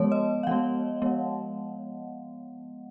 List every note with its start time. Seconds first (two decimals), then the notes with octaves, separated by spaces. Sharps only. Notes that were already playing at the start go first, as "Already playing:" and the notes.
Already playing: F3 G#3 B3 C#5
0.12 D#5
0.43 F5
0.47 F3 G#3 B3 F#5
1.02 F3 G#3 B3